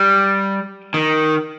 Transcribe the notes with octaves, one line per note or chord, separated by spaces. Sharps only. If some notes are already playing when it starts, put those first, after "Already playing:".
Already playing: G3
D#3